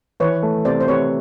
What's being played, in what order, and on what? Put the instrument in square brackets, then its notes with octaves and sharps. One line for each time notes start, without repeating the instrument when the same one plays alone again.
[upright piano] E3 [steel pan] B4 C#5
[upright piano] A3
[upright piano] C3 [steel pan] C5 D5
[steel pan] C5
[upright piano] C3 [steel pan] B4 C#5